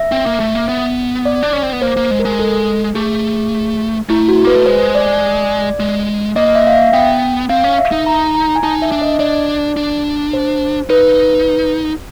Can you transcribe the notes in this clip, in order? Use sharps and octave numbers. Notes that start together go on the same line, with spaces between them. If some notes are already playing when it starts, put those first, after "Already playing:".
Already playing: E5
C4
A#3
A3
A#3
B3
D5
D4
C#4
C4
B3
A#3 C5
A#3
G#3
A#4
G#3
A4
A3 G#4
A3 E4
F#4
A#3 B4
A3
G#3 C5
D5
G#3
A#3 D#5
E5
F5
E5
B3 G5
C4 F5
C#4
E5
D#4
A#5
A#5
G#5
D#4 A5
E5
D4
D#5
D4 D5
D4
C5
D#4 B4